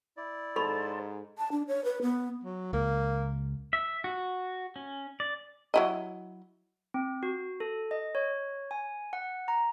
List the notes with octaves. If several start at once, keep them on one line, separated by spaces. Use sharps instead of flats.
E4 D5
G#2 A4 C5 A5 B5 C#6
A5
D4
C#5
B4
B3
F#3
C#2 A#3
E5
F#4
C#4
D5
F#3 E4 D#5
C4
F#4
A4
D#5
C#5
G#5
F#5
A#5